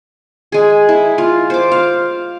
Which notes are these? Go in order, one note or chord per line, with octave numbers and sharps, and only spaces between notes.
G#3 G#4
E4
F4
C5 D6
F5